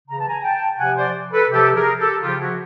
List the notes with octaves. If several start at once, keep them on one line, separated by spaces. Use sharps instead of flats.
C#3 E3 A#5
A5
G#5 A#5
G5 A5
C3 F3 F#5 G#5
C5 D5
A4 B4
C3 F3 G4 A4
G#4 A#4
G4 A4
C#3 F3 F4 G4
E4 F#4